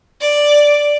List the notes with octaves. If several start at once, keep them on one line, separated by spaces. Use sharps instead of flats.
D5